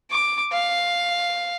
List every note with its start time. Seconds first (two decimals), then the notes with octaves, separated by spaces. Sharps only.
0.11 D6
0.53 F5